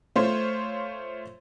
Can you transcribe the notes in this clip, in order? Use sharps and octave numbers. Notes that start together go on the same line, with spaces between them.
A3 F4 C5 C#5